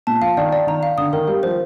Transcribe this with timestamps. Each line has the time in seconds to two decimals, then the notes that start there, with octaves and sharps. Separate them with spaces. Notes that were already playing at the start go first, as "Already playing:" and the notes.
0.07 A#2 A5
0.22 F3 F5
0.37 D#3 D5
0.53 D5
0.67 D#3 A#5
0.83 F5
0.98 D3 D#6
1.13 D#3 A#4
1.28 G3 F5
1.43 F3 C5